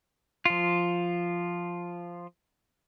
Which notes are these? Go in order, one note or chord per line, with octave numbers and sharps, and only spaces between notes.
F3 F4